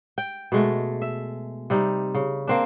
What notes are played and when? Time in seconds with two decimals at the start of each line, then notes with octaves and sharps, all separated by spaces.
0.18 G5
0.52 B2 G#3 A3
1.02 E5
1.70 C3 G3 D#4
2.15 C#3
2.48 A#3 C4 D4